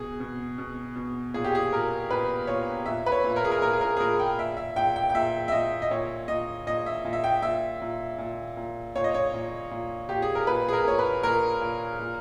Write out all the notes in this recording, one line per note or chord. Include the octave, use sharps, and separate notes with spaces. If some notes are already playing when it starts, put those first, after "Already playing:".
Already playing: B2 G#4
B2
B2
B2
A#2 G#4
G4
G#4
A#2 A#4
A#2 B4
A#2 C#5
A#2 E5
B4
C#5
A#2
A#4
G#4
A#4
A#2 A#4
G#4
A#4
G#4
A#2 A#4
G5
A#2 E5
E5
A#2 G5
G5
G5
A#2 E5
E5
A#2 D#5
D#5
A#2 C#5
A#2 D#5
A#2 D#5
E5
A#2
E5
G5
A#2 E5
A#2
A#2
A#2
A#2 C#5
D#5
C#5
A#2
A#2
A#2 G4
G#4
A#4
A#2 B4
G#4
A#4
A#2 C#5
B4
A#2 A#4
A#2
A#2